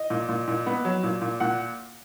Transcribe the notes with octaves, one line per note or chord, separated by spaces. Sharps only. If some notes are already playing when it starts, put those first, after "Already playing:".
Already playing: D#5
A#2
A#2
A#2
B3
F#3
A#2
A#2
A#2 F#5